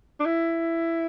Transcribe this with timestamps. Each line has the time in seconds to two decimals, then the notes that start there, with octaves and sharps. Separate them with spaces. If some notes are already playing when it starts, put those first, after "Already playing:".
0.20 D4
0.25 E4